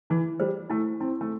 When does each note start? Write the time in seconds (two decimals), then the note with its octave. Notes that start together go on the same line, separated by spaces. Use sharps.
0.10 E3 E4
0.40 G3 C5
0.70 A3 E4
1.00 C4 E4
1.21 A3